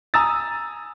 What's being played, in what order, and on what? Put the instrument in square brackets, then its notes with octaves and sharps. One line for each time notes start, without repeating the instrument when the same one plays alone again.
[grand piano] G#5 A#5 D#6 E6 A6